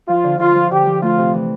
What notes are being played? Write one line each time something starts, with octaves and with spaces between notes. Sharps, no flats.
F3 F4
D3
D3 F4
F3
D3 G4
F3
A3 F4
C3
E3